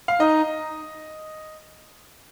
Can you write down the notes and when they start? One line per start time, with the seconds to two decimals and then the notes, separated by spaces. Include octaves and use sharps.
0.08 F5
0.19 D#4 D#5